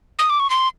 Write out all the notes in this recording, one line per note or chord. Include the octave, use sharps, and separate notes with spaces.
D#6
D6
C#6
C6